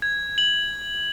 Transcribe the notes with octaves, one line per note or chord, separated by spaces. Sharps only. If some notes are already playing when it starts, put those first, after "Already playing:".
G#6
F#7